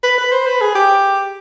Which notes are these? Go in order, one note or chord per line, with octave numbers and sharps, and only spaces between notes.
B4
B4
C5
B4
G#4
G4